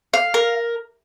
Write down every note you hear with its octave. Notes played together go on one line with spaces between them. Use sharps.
F5
A#4